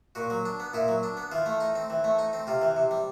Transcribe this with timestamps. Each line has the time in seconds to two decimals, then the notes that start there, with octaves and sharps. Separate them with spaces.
0.15 A#2 F#4
0.30 F#3
0.45 D4
0.60 B3
0.74 A#2 E4
0.88 F#3
1.03 D4
1.17 B3
1.32 E3 F4
1.46 A3
1.60 D#4
1.75 C4
1.90 E3
2.04 A3
2.19 D#4
2.33 C4
2.47 C3 F4
2.62 E3
2.77 C3
2.91 G3